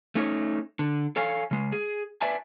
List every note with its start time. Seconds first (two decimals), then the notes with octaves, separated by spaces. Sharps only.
0.15 A3 C#4 D#4 C#5
0.79 D3
1.16 A4 C#5 F5 G#5
1.51 C#3 G#3
1.72 G#4
2.21 B4 D5 E5 G#5 A5